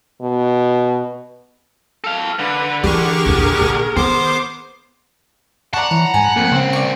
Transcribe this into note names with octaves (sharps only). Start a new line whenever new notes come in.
B2
A4 F5
D3 B4
E3 G4 G#4 A#4 C#6
A#1 E2
A#1
D#3 B3 C5 D6
D5 F#5 A5 A#5 C#6
E3 C#5
G#2 G#5
F2 A#3
C#3 A#3 C4
D5 C#6